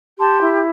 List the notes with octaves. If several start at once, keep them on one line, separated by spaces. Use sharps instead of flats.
G4 A5 C6
E4